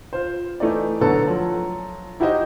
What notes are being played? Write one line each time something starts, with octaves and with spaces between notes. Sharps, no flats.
F4 C5
E3 A3 D#4 D5
B2 D3 F#3 B3 A4
F3 F#3
D#4 E4 F#4 G4 C5 D#5